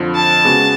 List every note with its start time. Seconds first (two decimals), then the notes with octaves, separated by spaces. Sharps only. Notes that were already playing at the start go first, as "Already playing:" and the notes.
Already playing: F2 D3 F3
0.15 A5
0.45 C#3 G#3 B3 F#4